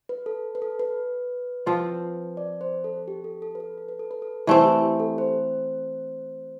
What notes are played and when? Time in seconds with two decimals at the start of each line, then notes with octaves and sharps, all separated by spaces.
0.09 B4
0.26 A4
0.55 B4
0.62 A4
0.79 B4
1.66 F3 C4 F4
2.37 D5
2.61 C5
2.84 A4
3.08 G4
3.24 A4
3.42 A4
3.55 B4
3.60 A4
3.78 A4
3.89 B4
3.99 A4
4.11 B4
4.22 A4
4.47 E3 A3 C4 B4
4.65 G4
4.82 G4
5.00 A4
5.18 C5